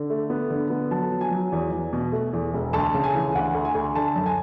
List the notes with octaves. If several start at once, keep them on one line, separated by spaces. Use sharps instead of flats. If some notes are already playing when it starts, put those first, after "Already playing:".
Already playing: D3
A3
B3
D3
B3
F#3 A5
F#3
G#5
F#3
E2
E2
B2
A3
E2
E1
D2 A5
C#3
G#5
E3
D2 F#5
D2
G#5
D2
D3 A5
F#2
G#5